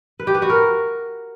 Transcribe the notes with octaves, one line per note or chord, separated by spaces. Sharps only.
B4
G4
B4
F#4
A#4